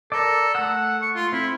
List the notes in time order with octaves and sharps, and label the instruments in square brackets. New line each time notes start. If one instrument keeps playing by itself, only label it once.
[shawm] A4 [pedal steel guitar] A#4 D5
[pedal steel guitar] A3 E6 [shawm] F#5
[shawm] C#6
F4
[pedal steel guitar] C4 [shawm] E4